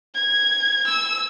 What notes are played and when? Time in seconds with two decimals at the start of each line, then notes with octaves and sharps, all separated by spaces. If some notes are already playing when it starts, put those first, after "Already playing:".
0.15 G#6
0.87 E6